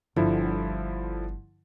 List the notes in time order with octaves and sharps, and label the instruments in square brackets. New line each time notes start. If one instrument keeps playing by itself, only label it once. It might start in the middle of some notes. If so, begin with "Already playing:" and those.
[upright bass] G1 [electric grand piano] D3 F3 E4